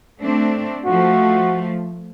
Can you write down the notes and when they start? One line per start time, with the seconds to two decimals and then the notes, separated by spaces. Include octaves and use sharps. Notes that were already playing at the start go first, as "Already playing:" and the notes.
0.20 A3 C4 D4
0.86 F3 A3 F#4